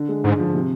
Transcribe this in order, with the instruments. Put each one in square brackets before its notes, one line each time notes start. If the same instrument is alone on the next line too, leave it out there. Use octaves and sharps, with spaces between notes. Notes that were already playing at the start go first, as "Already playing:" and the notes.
Already playing: [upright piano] D3
G#3
[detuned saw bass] G#2 [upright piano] D3
[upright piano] F3
C3